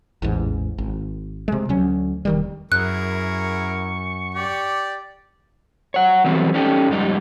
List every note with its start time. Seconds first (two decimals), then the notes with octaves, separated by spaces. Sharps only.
0.22 A1 E2 G#2
0.78 G#1
1.48 C3 G#3
1.69 D2 F#3 C#4
2.25 E1 D#3 G3
2.72 F#2 E4 G#4 A#4 C#6 F#6
4.35 G4 D5
5.94 C#5 F#5
6.24 E3 F#3 G3 A3 B3 C4
6.54 C#4 D#4 G4 A4
6.89 F2 G#2 G3 D#4